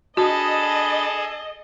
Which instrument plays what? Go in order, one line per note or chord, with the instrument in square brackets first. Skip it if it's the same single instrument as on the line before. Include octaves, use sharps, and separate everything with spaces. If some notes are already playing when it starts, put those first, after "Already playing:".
[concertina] D4 B5 [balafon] F#4 [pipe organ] G#4 A4 A5 [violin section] D#5